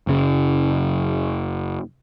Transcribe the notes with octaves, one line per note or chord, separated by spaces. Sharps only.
F#1 C#3